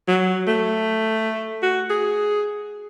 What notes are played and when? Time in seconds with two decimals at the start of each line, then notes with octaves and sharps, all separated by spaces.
0.08 F#3
0.48 A3
1.63 F#4
1.90 G#4